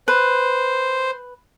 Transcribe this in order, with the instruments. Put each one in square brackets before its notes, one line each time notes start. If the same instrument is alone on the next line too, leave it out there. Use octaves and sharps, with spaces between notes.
[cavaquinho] B4 [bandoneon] C5